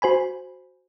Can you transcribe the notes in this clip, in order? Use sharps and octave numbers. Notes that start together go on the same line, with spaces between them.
F#4 C5 G#5 B5